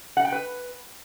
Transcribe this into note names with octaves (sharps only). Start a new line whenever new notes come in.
F#5
G5
B4